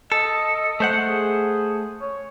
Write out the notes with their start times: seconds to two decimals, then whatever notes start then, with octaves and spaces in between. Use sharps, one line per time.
0.12 A4 D#5
0.80 A3 C5 F#5
1.08 G#4
2.01 C#5